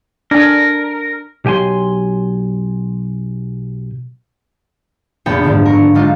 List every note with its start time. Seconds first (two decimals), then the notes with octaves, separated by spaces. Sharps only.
0.31 D4 A#4 G#5
1.45 B1 G4 G5 G#5 C6
5.26 F1 A#1 B3 F#4 G5 C#7
5.43 G1 G#2 D3 F3
5.65 A#4 C#6
5.95 F#3 G#3 D4 D#4 F4